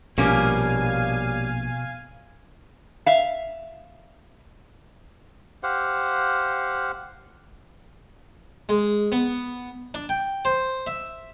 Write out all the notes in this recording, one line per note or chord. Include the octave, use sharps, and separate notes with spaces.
A#1 B2 G3 A#3 C#4 F5 G#5
E5 F5
G4 C5 F5 F#5
G#3
B3
D4
G5
C5
E5